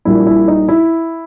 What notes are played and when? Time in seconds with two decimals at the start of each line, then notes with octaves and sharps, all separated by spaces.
0.05 A#1 A#2 G3 E4
0.27 E4
0.48 D#4
0.69 E4